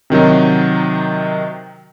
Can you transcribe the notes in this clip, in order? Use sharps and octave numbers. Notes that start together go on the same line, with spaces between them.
C3 D#3 F#3 D#4